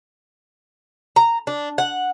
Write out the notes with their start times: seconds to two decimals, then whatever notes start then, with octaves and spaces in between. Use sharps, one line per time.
1.16 A#5
1.47 D4
1.78 F#5